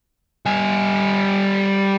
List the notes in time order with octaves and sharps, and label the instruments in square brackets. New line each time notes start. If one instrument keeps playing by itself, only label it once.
[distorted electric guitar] G3 G#5